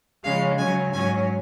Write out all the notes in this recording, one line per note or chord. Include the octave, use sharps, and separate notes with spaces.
C#3 F3 G#3 C#4 F5
C#3 F#3 C#4 G#5
G#2 F#3 C#4 G#5